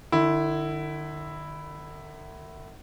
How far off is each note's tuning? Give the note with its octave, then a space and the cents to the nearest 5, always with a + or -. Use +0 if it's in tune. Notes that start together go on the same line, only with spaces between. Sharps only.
D3 +45 E4 +0